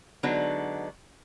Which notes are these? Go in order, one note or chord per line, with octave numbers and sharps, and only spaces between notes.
D3 F#3 G#3 B3 D4 D#4